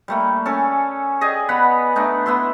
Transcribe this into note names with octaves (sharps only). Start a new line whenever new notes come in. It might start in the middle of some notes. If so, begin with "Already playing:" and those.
G3 A3 A#3
C#4 A4 G#5
G4 G#4 D5 D#5
B3 B4 F#5 B5
A3 D4 D#4
B3 E4 E5 C6